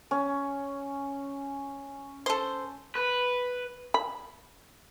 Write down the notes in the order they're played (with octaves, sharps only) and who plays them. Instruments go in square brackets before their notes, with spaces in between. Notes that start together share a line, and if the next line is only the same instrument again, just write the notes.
[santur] C#4
[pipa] A4 C5
[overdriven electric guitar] B4
[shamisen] B5